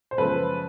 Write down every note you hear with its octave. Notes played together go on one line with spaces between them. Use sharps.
C5
F#2 C#3 F3 G#3 A4 B4